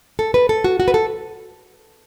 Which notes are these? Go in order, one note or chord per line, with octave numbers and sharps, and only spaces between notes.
A4
B4
A4
F#4
F#4
B4
A4